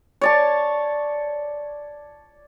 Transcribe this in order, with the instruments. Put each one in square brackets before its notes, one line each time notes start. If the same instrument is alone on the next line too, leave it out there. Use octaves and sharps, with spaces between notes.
[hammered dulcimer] C#5 D5 A5